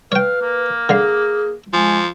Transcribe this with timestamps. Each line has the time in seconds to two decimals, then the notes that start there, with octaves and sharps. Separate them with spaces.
0.12 B4 C#5 F5 G5
0.42 A#3
0.89 D3 G#4 F5
1.73 F3 G#3 G#5